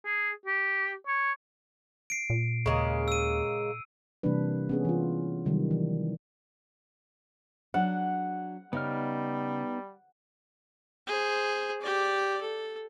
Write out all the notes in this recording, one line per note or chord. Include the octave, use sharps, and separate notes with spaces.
G#4
G4
C#5
C7 D7
A#2
D#2 C#3 G#3 A#3
E6 D#7
C3 E3 G3 A#3 D4 B4
B3 C#4 G#4
E3 F4
C3 D#3 F#3 G3
E3
F#3 D4 F#5
C#3 G3 B3 D#4 F6
G#4 C5
G4 D5
A4